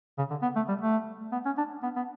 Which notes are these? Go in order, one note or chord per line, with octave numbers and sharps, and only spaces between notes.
C#3
D3
B3
A3
G3
A3
B3
C#4
D4
B3
B3